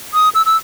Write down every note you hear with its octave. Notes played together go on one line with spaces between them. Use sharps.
D#6
E6
E6